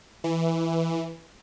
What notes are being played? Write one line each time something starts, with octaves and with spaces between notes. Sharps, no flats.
E3